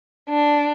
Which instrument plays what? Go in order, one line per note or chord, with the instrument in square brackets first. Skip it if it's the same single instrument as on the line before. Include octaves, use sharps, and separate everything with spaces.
[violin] D4